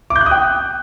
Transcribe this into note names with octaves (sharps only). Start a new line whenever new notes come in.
D6
G6
F#6
D#6
G5